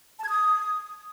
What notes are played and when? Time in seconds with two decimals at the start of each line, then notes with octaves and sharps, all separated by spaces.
0.19 A5
0.24 G#6
0.29 D#6